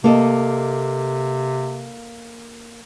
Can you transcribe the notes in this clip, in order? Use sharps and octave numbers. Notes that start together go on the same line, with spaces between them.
C3 A#3 A4 D#5